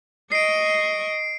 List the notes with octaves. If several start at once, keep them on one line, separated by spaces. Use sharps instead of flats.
D#5 C#6 C7 D7